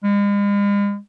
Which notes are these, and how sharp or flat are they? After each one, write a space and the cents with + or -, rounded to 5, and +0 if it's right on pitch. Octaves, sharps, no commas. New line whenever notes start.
G#3 -45